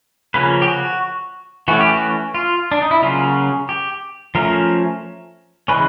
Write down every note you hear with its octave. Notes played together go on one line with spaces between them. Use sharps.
C#3 F3 A#3 C#4 B4
G4
F#4
E3 A3 C#4 F#4
G4
F#4
F4
D4
D#4
E4
C#3 F#3 A#3 C#4 F4
G4
F3 A3 C#4 A#4
C#3 E3 G#3 C#4 B4